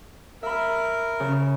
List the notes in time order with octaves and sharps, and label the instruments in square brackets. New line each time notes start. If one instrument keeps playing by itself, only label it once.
[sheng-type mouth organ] A#4 [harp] E5 B5
[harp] C#3